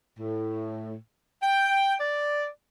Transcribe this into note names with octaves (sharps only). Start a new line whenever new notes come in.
A2
G5
D5